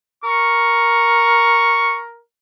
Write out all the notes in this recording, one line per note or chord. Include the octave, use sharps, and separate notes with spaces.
A#4 C#6